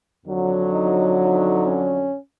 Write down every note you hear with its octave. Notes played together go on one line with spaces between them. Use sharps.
F2 D3 F#3
D#4
D#4
C#4